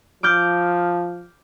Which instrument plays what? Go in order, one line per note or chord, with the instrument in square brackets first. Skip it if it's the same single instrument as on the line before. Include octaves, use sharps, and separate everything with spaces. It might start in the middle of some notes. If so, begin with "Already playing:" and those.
[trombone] F3 [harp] D6 F6 G6